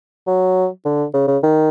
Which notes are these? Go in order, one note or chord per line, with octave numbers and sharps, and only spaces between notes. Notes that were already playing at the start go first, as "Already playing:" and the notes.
F#3
D3
C#3
C#3
D#3